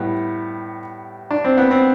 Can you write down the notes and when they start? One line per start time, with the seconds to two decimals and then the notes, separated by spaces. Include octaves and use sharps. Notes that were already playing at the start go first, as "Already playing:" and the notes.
Already playing: A2 G3 B3
1.31 D4
1.44 C4
1.57 B3
1.71 C4